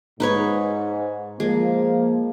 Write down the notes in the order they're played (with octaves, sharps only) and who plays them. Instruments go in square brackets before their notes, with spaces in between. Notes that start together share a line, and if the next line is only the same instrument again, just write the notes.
[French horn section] G#2 [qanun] D#4 B4 C#5
[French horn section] F3 A#3 [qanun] G#3